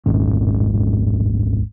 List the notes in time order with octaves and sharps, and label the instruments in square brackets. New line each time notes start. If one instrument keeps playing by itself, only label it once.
[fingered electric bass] D1 G#1 G#2 C#4